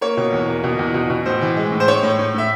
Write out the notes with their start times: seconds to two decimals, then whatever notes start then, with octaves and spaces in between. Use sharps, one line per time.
0.01 A#3 C#5
0.17 B2
0.33 E2
0.48 A#3
0.64 B2
0.79 E2
0.94 B2
1.10 B2
1.26 A2 C5
1.41 E3
1.56 G#3
1.72 A2
1.80 C5
1.88 A2 C#5
2.03 A2
2.19 A2
2.34 A2 E5